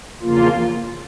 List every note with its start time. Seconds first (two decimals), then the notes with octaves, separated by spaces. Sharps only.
0.21 E2 C#3 F3 A#3 F4